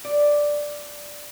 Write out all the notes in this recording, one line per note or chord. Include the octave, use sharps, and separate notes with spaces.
D5